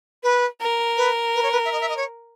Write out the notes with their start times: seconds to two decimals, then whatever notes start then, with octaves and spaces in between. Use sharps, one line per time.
0.23 B4
0.61 A#4
0.97 B4
1.35 B4
1.43 C#5
1.52 B4
1.65 E5
1.72 D#5
1.81 E5
1.89 D#5
1.97 C#5